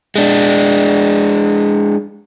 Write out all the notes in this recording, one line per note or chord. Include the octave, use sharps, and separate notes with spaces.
G#3 D4